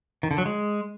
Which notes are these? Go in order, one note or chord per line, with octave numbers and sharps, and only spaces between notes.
D#3
D3
F#3
G#3